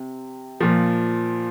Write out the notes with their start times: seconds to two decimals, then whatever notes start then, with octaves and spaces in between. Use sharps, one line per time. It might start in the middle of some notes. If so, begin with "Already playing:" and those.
Already playing: C3
0.60 A#2 F3